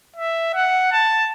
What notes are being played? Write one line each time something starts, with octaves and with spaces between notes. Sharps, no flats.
E5
F#5
A5